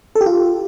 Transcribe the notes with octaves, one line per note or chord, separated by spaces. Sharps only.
A4
G4
F4